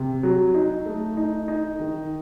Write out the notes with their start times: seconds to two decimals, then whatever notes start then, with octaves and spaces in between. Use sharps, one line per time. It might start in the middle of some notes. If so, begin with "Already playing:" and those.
Already playing: C3
0.23 F#3
0.54 D#4
0.86 A3
1.17 D#4
1.48 D#4
1.80 D#3